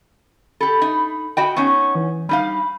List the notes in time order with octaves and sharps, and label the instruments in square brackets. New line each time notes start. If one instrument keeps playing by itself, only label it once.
[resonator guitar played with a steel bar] G4 A4 [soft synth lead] B5
[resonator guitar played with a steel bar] D#4
[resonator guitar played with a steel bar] F#4 D#5 G5 [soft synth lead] B5
[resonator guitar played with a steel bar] B3 C#4 D#4 [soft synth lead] C#6
[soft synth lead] E3
[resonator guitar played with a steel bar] G3 D#4 F5 [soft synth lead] B5